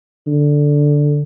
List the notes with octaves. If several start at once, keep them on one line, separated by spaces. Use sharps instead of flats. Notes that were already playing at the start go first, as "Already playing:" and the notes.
D3